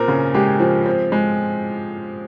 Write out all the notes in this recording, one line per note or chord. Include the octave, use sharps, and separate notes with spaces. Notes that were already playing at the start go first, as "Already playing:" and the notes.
Already playing: A#2 C4 A#4
C#3
G#3 G4
F3
C4
G#3